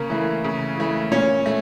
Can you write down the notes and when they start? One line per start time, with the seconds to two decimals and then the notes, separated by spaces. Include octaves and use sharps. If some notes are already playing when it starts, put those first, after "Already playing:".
Already playing: C#3 A#3 A#4
0.10 E3 A3
0.44 C#3
0.77 E3 A3
1.11 A#2 C#4 C#5
1.46 A3